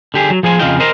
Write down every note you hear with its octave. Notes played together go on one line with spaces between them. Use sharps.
D3 G4 G#4
F#3
F3 G#4 C5 G#5
F2 C#3 F4 D#5 G5
A#4 C5 D#5